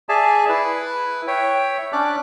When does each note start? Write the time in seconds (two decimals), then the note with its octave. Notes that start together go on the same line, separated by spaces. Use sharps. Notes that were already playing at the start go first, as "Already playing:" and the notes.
0.09 G#4 D5 E5 G#5 A5
0.49 E4 B4
1.27 C#5 E5 G5
1.93 C#4 D4 D5 D6 F#6